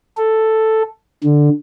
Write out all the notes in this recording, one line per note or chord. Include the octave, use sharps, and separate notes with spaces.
A4
D3